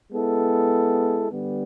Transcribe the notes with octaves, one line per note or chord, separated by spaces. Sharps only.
G#3 B3 E4 A4
D3 G3 B3